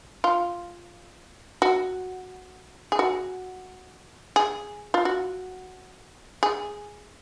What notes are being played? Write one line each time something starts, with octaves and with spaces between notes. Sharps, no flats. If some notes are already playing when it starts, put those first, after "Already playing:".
F4
F#4
G#4
F#4
G#4
F4
F#4
G#4